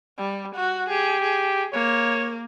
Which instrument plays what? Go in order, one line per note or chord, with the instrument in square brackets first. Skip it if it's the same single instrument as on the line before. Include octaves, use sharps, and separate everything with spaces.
[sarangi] G3
F#4
[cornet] G4 [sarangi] G#4
[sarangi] G#4
[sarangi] A#3 [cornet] C#5